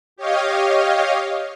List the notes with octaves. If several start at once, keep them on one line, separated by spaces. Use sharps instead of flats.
G4 C#5 D#5 F5